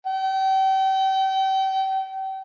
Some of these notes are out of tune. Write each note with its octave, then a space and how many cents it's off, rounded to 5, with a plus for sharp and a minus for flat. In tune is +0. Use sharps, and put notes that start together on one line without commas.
G5 -35